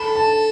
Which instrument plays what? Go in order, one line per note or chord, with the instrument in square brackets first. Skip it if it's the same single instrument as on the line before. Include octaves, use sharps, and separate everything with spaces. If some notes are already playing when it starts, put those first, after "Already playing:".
Already playing: [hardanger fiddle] A4 [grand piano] B5
[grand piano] A5